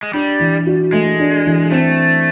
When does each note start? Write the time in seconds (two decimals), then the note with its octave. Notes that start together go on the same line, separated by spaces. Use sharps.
0.03 G#3
0.14 G3 D4
0.40 E3
0.67 F#4
0.93 G#3 A3
1.19 D4
1.46 E3
1.71 A3 C4